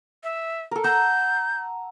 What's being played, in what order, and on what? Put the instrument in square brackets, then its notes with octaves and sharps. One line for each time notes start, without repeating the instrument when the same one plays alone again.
[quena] E5
[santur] A4 A#4
[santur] F#5 A#5 E6 [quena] G6